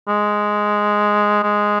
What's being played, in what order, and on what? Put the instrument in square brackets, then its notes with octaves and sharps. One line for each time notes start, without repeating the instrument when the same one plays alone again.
[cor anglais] G#3
G#3